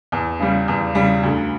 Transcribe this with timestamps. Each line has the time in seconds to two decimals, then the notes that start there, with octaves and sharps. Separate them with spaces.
0.12 E2
0.40 C#3 G3
0.68 E2
0.95 C#3 G3
1.23 D2